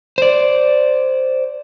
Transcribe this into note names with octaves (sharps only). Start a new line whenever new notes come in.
C5 D5